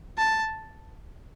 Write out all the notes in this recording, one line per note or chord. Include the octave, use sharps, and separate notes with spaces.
A5